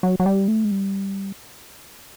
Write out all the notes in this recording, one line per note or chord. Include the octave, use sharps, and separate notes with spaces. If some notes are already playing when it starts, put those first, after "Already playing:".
F#3
F#3
G3
A3
G#3
G3